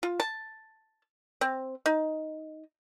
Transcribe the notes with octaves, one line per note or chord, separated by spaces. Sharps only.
F4
A5
C4
D#4